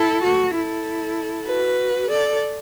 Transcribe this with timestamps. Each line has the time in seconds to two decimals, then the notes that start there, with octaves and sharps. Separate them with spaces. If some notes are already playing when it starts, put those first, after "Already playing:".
Already playing: E4 A4
0.23 F#4
0.55 E4 A4
1.47 F#4 B4
2.08 A4 D5